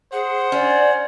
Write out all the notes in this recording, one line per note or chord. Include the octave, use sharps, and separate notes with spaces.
G#4 C5 F#5
C#4 D5